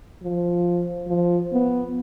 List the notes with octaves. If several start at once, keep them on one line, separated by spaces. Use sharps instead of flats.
F3
F3
B3